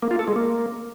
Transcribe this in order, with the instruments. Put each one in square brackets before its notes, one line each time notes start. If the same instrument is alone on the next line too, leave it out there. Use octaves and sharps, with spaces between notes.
[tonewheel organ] A#3
F4
A4
G#3
A#3